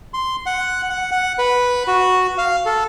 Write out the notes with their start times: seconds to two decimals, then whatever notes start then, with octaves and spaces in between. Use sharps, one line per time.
0.14 C6
0.46 F#5
0.90 F#5
1.11 F#5
1.39 B4
1.87 F#4
2.38 F5
2.66 A4